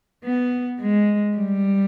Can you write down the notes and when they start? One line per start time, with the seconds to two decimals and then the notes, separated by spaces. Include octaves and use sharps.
0.25 B3
0.81 G#3
1.37 G3